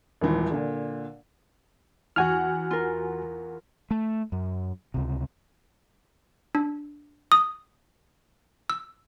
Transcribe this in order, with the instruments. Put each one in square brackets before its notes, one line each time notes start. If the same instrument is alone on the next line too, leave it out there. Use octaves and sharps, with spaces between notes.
[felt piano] D#1 G#1 D#3 E3
A#2 D3
[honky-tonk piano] E2 F#5 [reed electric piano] F#4 G#5 F6
[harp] F4 A#4
[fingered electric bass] A3
F#2
C#2 C3
[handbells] D4
D#6
E6